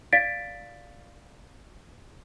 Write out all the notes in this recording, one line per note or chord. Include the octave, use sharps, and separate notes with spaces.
D5 F5 A6 B6 D7